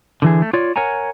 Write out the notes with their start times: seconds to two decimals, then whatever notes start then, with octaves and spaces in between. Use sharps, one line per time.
0.22 D3 E3 G#4
0.42 A3
0.53 F4 C#5 D5
0.76 A#4 C#5 F#5 G#5 A#5